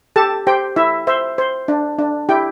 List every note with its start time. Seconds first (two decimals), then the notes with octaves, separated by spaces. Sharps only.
0.16 G4 A4 A5
0.47 G4 C5 G5
0.76 E4 E5
1.07 C5 E5
1.38 C5
1.68 D4
1.99 D4
2.29 E4 G4 G5